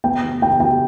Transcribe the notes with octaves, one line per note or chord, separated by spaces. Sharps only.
B3 G5
B3
B3 G5
B3 G5